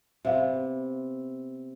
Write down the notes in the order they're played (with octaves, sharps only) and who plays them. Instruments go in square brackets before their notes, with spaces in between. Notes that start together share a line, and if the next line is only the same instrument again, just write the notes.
[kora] C3 B3 [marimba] E5 F5